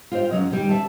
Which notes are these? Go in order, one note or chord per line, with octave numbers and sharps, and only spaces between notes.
F4 G4 C5 D#5 F5
F#2 F3 F#3 D#5
D#3 G3
D5 E5 A5